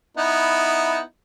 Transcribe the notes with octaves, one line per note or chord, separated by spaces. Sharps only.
B3 D#4 E4